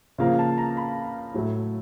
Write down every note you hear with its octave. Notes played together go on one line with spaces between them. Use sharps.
C#3 F3 A#3 F5
A5
A#5
B5
A2 F#3 A3